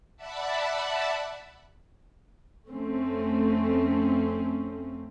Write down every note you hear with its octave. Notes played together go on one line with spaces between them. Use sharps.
D5 E5 F#5 A5 B5
F2 A3 C4 C#4